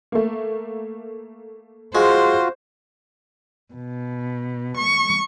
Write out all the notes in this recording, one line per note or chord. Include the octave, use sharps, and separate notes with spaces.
A3 A#3
G#3 F4 F#4 C5
B2
C#6